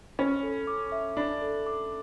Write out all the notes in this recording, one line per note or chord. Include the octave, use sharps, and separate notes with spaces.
C#4 B5
A4
D6
E5
D4 B5
A4
D6